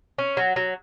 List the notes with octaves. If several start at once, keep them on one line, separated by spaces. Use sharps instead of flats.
C#4
F#3
F#3